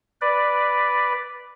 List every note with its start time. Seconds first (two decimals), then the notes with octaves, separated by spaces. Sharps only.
0.21 B4 D5